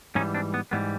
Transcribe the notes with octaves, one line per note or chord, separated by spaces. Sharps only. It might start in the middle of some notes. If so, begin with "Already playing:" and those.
G#2 E3 G3 C#4 D#4
C4 D4
B3
G#2 E3 G3 B3